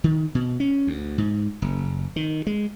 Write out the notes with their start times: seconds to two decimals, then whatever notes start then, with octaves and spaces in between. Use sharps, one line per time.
0.04 D#3
0.35 B2
0.60 C#4
0.87 D2
1.18 G#2
1.62 F#1
2.16 D#3
2.47 G#3